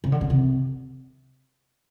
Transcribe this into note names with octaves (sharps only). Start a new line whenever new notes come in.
C#3
D3
C#3
C3